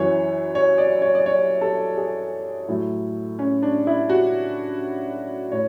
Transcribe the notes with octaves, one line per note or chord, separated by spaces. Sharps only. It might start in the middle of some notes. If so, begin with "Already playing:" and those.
Already playing: F#2 E3 C#5
C#5
D5
C#5
D5
C#5
A4
G#4
A2 F#3
C#4
D4
E4
F#4
A2 C#5